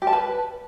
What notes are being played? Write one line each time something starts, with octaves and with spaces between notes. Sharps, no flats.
G4
A5
B4